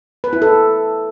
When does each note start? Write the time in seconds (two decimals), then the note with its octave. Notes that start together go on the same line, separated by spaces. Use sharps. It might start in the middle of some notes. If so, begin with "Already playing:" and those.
0.24 B4
0.33 E4
0.42 A4